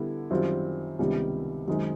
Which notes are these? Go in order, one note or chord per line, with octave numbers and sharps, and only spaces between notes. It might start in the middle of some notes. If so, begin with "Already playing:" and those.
Already playing: D3 G3 B3 E4
F#2 D#3 G3 C4 F4
C#2 C3 D#3 G3 B3
F#2 D#3 G#3 C4 D#4